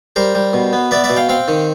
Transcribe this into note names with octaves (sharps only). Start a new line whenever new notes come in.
G3 A#4 C5
G3
B2
B3
B3 D5 E5
D5 E5
B2
F5 G5
C4 F5 G5
D#3